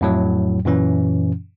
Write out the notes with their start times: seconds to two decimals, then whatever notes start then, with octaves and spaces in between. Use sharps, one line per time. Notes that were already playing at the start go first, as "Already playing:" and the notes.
0.01 F2 A2 F#3
0.65 F#2 A#2 E3 C#4